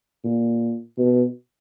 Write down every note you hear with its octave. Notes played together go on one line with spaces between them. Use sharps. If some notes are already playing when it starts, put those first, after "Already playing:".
A#2
B2